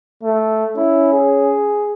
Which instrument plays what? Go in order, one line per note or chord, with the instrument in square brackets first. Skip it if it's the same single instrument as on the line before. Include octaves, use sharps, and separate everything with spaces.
[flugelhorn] A3
[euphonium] C#4 [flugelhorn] E4
[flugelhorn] G#4